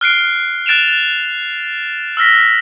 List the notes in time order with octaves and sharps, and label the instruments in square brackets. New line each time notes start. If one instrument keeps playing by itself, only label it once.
[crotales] F6 F#6 C7 D7
F#6 A6 D7 E7 F7
E6 F6 A#6 B6